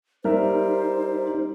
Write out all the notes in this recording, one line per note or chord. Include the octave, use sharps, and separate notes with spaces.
G3 D#4 A#4 C5 E5